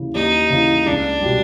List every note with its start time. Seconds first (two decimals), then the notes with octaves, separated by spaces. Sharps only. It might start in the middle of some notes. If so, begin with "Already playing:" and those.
Already playing: D#2 C#3 E3
0.14 D#2 D#4
0.50 C#3 E3
0.86 C#2 D4
1.21 B2 G3